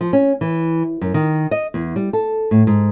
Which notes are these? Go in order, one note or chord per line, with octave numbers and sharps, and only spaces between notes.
F3
C#4
E3
F#2
D#3
D#5
E2
G3
A4
A2
G#2